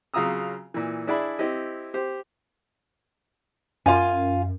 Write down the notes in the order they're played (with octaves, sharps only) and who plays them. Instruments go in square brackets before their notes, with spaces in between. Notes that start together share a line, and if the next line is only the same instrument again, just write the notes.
[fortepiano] C#3 F#3 F4 A#5 D#6 E6
A#2 E3
D4 E4 G#4 D5 E5 B5
C4 E4 G4 D#5
G4 C5
[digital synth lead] F#2 [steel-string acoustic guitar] F4 F5 G#5